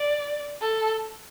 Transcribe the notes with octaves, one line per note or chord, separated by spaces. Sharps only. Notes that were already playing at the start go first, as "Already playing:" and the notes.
Already playing: D5
A4